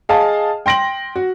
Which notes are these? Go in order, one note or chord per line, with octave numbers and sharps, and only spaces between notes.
G#4 D#5 F5 A5
G5 C6 A#6 D7 F#7
F#4